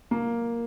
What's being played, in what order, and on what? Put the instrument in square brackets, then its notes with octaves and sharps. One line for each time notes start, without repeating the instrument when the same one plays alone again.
[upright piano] A#3